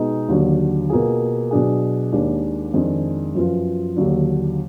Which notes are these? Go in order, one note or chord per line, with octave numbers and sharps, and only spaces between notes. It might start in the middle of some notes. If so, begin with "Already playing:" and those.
Already playing: B2 G#3 D#4 G#4
D#2 D3 F#3 D4
B2 A#3 F4 G#4
B2 F#3 D4 G#4
D#2 D#3 G#3 D4
F2 D#3 G#3 D4
F#2 F3 B3 F4
D#2 D3 F#3 D4